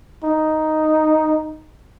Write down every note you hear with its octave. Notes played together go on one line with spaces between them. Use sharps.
D#4